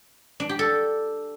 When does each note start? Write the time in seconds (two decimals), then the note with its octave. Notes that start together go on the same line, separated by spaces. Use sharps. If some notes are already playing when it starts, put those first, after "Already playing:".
0.40 D4
0.49 G4
0.59 A4